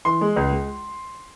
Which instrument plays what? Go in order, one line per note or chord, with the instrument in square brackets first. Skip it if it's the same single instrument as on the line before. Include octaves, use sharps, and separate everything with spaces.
[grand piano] E3 C6
G#3
C#2
G#3